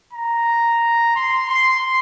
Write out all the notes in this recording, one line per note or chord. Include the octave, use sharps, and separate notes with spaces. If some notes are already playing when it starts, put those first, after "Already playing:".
A#5
C6
C6